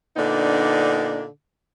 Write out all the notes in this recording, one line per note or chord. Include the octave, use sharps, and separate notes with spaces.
A#2 D3 B3 D4 D#4